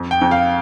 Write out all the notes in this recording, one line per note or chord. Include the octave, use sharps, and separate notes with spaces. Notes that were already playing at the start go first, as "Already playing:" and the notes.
Already playing: F2
G5
F2
F5